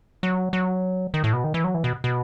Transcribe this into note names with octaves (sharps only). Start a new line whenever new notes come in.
F#3
F#3
D#3
A2
B2
D#3
E3
F#3
E3
B2
B2